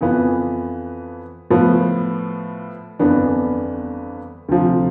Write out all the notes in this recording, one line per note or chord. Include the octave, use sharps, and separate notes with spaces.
F2 E3 B3 F4
A2 F3 B3
G1 F2 E3 B3 D4
D2 C3 F3